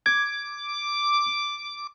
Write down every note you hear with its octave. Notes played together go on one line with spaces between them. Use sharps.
D6 G#6